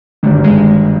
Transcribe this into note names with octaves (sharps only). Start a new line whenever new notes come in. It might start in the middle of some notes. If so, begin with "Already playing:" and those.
G#1 G2 D3 D#3
G#3